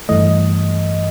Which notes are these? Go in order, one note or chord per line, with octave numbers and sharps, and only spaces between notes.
G2 E3 A3 D#5